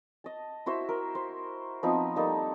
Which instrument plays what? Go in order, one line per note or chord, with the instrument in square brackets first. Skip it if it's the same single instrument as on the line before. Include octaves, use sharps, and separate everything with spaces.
[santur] D#5 A5
E4 F#4 C5 E5
A#4
C5
F3 B3 C4 D#4
G3 A#3 D#4 A4